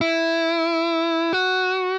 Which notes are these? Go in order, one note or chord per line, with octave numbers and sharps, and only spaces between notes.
E4
F#4